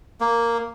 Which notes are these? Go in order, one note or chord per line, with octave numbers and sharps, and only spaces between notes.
A#3